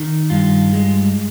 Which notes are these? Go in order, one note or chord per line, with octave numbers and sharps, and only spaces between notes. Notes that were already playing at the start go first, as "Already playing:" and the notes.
Already playing: D#3
G2 F4
G#3